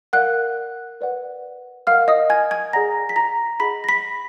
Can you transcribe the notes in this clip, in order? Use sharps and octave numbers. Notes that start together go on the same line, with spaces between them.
A#4 D5 F5 F#5 F#6
B4 D5 F#5
A#4 D#5 F5 F#5 F6
D#5 D#6
G#5 G#6
G#5 G#6
G#4 D5 F#5 A#5 A#6
B6
A#5 A#6
G#4 D#5 F#5 B5 B6
A#6
B5 B6